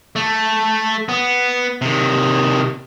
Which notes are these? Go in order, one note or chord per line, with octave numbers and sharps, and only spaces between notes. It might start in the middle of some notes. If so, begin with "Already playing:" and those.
A3
B3
C3 D#3